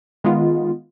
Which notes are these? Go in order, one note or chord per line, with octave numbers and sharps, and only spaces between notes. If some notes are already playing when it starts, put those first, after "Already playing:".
D#3 G#3 B3 F4